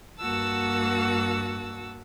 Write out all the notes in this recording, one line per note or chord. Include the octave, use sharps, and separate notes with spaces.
G2 A#3 F#4 F#5 A5 E6